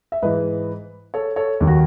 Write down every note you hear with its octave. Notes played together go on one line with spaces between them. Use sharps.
E5
G#2 E3 B4 D#5
A4 C#5
A4 C#5
D#2 D#3
F#4